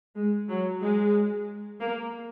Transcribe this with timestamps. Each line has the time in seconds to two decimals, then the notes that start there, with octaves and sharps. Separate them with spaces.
0.16 G#3
0.49 F#3
0.82 G#3
1.80 A#3